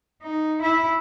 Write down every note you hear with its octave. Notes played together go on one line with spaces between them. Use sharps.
D#4
E4 E5